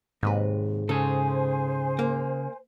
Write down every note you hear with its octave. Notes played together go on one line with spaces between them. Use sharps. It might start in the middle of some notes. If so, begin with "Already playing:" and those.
D#2 G#2 C3 B4
C#3 G#4 A4 C5 G#5
A#3